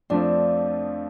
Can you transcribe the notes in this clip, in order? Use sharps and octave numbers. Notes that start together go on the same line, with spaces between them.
F2 F3 A3 C4 D4 F4